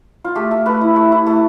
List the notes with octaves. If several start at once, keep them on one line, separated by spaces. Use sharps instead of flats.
F4
A3 G4
A3
A3 B4
E4
A3
E4
A3